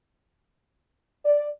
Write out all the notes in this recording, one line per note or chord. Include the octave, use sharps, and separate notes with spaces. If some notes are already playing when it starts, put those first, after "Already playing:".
D5